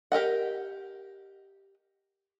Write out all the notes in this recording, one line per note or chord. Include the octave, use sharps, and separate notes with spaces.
G4 A#4 D#5 F#5